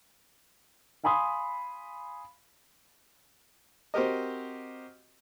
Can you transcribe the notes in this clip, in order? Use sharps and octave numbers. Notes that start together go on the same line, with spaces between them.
F5 G#5 B5 C6 D#6
C4 F#4 G4 A#4 D#5